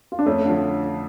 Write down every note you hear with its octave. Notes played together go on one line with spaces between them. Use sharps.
F4
D4
F2 A3 C#4
D3 F3